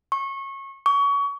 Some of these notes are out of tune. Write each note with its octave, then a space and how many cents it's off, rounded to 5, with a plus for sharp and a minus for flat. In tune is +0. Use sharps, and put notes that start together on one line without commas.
C#6 -25
C#6 +30